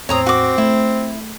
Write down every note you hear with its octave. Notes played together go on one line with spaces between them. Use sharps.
E2 A2 C4 C#5 A#5 D#6
F#4 D6
A3 E4